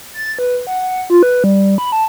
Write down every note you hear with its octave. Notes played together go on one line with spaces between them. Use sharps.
A6
B4
F#5
F4
B4
G3
B5
A5